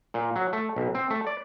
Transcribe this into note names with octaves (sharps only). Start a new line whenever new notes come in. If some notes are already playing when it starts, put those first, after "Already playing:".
A#2
F#3
A3
B1
C4
A3
D5